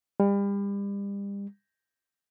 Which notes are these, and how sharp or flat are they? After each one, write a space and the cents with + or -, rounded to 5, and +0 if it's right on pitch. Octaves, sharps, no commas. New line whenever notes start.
G3 +35